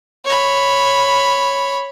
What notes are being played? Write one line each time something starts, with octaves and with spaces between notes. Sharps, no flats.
C#5 B5